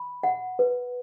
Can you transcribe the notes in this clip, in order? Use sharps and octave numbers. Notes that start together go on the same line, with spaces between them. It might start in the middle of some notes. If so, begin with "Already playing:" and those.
Already playing: B5
F#5
B4